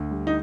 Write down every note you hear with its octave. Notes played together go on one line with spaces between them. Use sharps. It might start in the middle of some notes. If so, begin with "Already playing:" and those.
Already playing: D2
G3
D#4